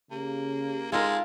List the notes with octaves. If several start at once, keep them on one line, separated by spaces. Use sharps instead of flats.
C#3 A#3 G4
G#3 D#4 F4 A4 A#4